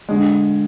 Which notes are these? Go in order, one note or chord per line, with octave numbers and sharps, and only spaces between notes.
D3 G#3